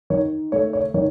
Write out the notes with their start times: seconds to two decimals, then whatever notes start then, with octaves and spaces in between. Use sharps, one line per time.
0.10 D#3 C#5
0.52 A3 C#5
0.73 C#5
0.94 D#3 C#5